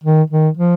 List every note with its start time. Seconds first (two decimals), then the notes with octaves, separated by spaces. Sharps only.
0.04 D#3
0.30 D#3
0.57 F3